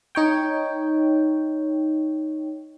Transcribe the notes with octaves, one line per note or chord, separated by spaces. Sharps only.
D#4 C#5 G5